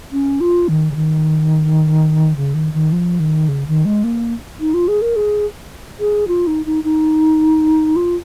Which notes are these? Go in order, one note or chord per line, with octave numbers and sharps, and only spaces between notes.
C#4
F4
D#3
C#3
D#3
C#3
D#3
D#3
F3
D#3
C#3
D#3
G#3
A#3
D#4
F4
G#4
A#4
G#4
G#4
F4
D#4
D#4
D#4
F4